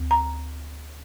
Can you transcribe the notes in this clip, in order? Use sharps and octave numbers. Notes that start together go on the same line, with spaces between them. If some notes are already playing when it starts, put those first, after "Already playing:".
Already playing: D2
A#5